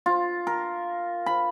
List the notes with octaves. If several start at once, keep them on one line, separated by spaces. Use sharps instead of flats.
F4
A#4
B5